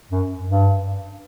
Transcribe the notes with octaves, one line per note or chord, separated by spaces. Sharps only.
F#2
G2